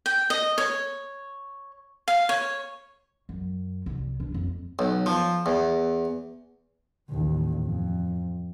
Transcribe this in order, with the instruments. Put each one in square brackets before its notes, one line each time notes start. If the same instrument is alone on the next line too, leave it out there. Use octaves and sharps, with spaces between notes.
[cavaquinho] G5
D#5
C#5
F5
C#5
[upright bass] F#2
C2
D4
F2
[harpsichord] B1
F3
E2
[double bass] A1 D#2
F2